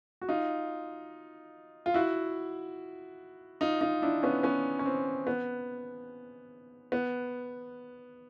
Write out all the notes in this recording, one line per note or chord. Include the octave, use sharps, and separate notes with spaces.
F#4
D#4 F4
F4
E4 F#4
D#4 F4
D#4 F4
D4 E4
B3 C#4
B3 C#4
C#4
C4
B3
B3